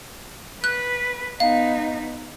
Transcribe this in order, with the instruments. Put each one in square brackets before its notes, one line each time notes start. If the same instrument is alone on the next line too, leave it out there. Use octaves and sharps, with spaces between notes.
[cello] B4 [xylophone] F#6
[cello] B3 D#4 [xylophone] F5